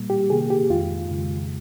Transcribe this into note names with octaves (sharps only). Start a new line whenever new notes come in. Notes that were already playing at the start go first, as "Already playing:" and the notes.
Already playing: A#2 G3 A#3
G4
C3 D#3 A#3 G#4
G4
F2 D#3 G#3 F4
F2 C#3 G#3